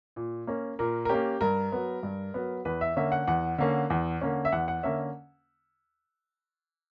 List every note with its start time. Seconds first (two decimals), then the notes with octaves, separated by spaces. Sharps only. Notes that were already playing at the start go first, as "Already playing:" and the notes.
0.16 A#2
0.47 A#3 C#4
0.79 A#2 A#4
1.05 A#4
1.09 A#3 C#4 G4
1.41 G2 A#4
1.72 F#3 B3
2.03 G2
2.34 F#3 B3
2.65 E2 B4
2.81 E5
2.96 D3 A#3 C#4 E5
3.12 F#5
3.28 E2 F#5
3.58 D3 A#3 C#4
3.90 E2
4.21 D3 A#3 C#4
4.45 E5
4.52 E2 F#5
4.68 F#5
4.83 D3 A#3 C#4 E5